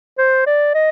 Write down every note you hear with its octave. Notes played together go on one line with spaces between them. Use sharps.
C5
D5
D#5